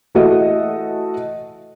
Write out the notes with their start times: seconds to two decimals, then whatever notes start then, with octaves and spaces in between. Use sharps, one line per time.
0.15 E3 A3 F#4 A4 D#5